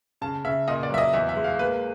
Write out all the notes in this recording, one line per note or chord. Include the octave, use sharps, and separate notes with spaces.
C#3 A5
C#3 E5
A#2 D#5
D5
F#3 E5
D#5
E2 E5
E5
G#3
F5
A#3 B4